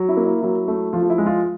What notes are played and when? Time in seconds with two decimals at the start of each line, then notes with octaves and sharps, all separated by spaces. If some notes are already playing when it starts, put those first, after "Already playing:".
Already playing: F#3
0.09 E4
0.17 A#3
0.26 E4
0.42 F#3 E4
0.68 A3
0.93 F3 F4
1.03 F4
1.10 E4
1.18 G#3
1.26 F4